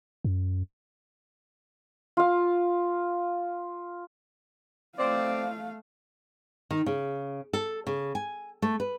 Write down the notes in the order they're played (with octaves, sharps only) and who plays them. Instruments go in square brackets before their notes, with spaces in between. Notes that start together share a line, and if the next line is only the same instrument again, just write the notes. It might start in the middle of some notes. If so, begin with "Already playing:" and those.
[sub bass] F#2
[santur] F4 F5
[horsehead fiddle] A3 F5 [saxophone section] C4 D5
[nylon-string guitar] D#3
C#3
A4
C#3
G#5
A3
B4